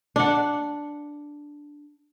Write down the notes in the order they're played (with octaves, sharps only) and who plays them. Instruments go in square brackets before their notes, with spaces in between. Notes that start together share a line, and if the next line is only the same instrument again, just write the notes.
[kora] D4 F#5